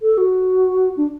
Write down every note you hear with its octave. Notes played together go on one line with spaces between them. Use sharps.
A4
F#4
D4